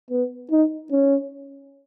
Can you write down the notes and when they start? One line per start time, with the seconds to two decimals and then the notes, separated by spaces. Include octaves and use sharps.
0.10 B3
0.51 D#4
0.92 C#4